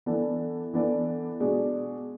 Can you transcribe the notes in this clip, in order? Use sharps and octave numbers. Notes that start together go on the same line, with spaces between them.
E3 B3 D4 A4 D5
E3 B3 D4 A4 D5
B2 G#3 D4